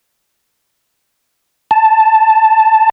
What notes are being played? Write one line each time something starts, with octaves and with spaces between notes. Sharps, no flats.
A5